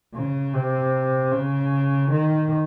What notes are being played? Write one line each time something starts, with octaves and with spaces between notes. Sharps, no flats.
C#3
C3
C#3
D#3